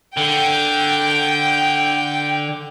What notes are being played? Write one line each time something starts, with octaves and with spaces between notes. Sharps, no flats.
D3 G5